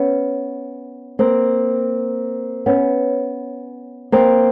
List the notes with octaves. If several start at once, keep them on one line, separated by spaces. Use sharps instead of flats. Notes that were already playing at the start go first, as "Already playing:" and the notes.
Already playing: B3 C#4
A#3 C4
B3 C#4
A#3 C4